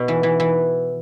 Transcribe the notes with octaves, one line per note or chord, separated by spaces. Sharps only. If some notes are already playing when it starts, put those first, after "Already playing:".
Already playing: B2
E3
E3
E3